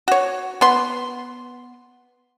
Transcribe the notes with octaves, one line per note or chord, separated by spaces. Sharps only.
F#4 C#5
B3 C6